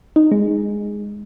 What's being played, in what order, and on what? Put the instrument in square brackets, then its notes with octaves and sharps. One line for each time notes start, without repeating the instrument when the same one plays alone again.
[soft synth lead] D#4
G#3